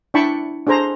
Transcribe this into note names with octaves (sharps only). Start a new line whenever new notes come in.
D4 E4 G5 A5 B5 C#6
D4 G#4 A4 C5 A#5